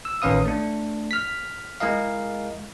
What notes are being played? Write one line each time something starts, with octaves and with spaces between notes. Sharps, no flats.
E6
A1 D#3 C#4 B4 F5 D#6
A3 D4
F6 B6
G#3 E4 G#4 A#4 D#5 F5